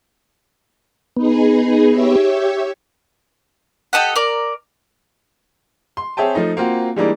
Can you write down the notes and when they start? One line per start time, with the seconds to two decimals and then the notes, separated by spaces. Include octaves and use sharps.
1.17 B3 D#4 G#4
1.89 G4 C#5 E5
3.93 G4 A4 D#5 F#5
4.16 A#4 D5
5.97 C6
6.17 C4 G#4 C#5 E5 G5 A5
6.35 F3 A3 D#4
6.57 A#3 C4 F4 F#4
6.96 E3 G3 G#3 A#3 D4 D#4